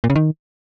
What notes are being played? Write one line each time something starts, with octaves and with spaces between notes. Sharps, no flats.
A#2
C#3
D#3